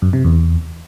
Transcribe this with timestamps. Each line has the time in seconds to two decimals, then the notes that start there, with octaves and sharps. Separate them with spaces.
0.02 F#2
0.13 C3
0.24 E2